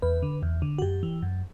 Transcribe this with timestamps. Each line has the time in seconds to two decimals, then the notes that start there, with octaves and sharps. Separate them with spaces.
0.02 E2 B4
0.23 D3
0.43 E2
0.62 D3
0.78 F#4
0.82 F#2 G4
1.03 E3
1.23 F#2